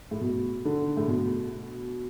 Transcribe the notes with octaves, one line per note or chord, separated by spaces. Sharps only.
A2
B2
D3
A2
B2